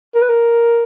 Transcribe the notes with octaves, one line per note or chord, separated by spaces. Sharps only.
A#4
B4
A#4